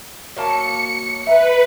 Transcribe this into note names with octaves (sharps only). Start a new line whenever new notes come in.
F#3 A#3 A5 C#7
B4 E5 A#5